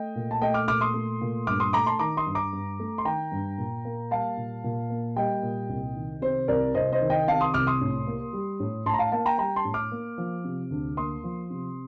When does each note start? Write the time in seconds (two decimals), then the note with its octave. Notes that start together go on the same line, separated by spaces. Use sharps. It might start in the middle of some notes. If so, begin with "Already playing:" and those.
Already playing: A3 D#5 G5
0.16 A#2
0.31 A5
0.41 A3 D#5 G5
0.54 D6 F6
0.68 A#2 D6 F6
0.81 C6 D#6
0.94 A3
1.21 A#2
1.47 G2 D6 F6
1.60 C6 D#6
1.73 A3 A#5 D6
1.86 A5 C6
1.99 D#3 A#5 D6
2.17 C6 D#6
2.26 G2
2.35 A#5 D6
2.53 G2
2.80 A3
2.98 C6
3.05 D#3 G5 A#5
3.32 G2
3.58 A#2
3.85 A#3
4.11 G3 F5 A5
4.37 A#2
4.64 A#2
4.90 A#3
5.16 G3 D#5 G5
5.43 A#2
5.69 C2
5.96 D#3
6.22 C3 C5
6.48 C2 A#4 D5
6.75 C2 C5 D#5
6.92 C5 D#5
7.01 D#3
7.10 D#5 G5
7.28 C3 F5 A5
7.41 C6 D#6
7.54 C2 D6 F6
7.67 C6 D#6
7.81 A2
8.07 A#3
8.33 G3
8.60 A2
8.86 A2 A5 C6
8.94 A#5
8.99 F5 A5
9.12 A#3 F5 A5
9.26 G5 A#5
9.38 G3 G5 A#5
9.56 A5 C6
9.65 A2
9.74 D6 F6
9.92 A#3
10.18 F3
10.44 C3
10.71 D2
10.97 A#3 C6 D#6
11.24 F3
11.50 C3